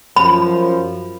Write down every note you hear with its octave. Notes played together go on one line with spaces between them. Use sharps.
F#2 F3 B5